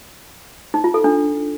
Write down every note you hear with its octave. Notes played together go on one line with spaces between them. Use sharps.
D#4
F4
A4
D4